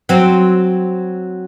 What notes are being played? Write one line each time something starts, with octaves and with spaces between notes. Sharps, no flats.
F#3 C4